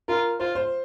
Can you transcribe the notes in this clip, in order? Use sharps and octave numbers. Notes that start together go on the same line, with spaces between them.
F4 A#4
F4 C5
C5